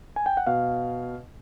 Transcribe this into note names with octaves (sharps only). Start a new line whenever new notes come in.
G#5
G5
F#5
B2 F5